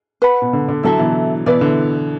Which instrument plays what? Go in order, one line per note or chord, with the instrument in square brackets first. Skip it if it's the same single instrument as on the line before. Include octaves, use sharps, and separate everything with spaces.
[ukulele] B4 F#5 B5
[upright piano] B2
D3
D3
[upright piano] D3 F#3 [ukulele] E4 A4 E5
[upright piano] B2 E3
[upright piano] B2 E3 [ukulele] E4 B4 D5
[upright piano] D3